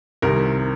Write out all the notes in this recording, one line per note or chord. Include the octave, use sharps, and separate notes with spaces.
C2 C3 D#3 A#4